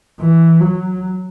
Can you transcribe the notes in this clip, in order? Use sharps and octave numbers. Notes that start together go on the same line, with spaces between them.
E3
F#3